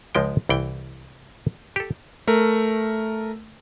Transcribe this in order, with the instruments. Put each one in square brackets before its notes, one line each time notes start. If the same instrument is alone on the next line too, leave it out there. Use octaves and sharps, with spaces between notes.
[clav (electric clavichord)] C#2 F3 G#3 G5
C2 E3 G5
G4 A4
[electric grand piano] A3 A#4